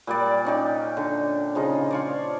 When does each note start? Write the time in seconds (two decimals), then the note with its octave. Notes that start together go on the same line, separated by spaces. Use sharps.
0.07 A#2 G3 D5
0.45 C#4 D#4 G4
0.97 D3
1.55 C#3 F3 D#4
1.91 F4 C#5 D5